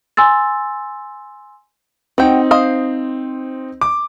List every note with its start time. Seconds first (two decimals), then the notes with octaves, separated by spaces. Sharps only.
0.17 G#5 C6 E6 A6
2.18 C4 D#4 F#4 G5
2.51 C5 D#5 F5
3.81 D6